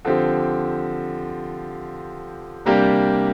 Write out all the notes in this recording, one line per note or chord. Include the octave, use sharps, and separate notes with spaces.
D3 F3 C4 G4
C3 G3 A#3 D4 G4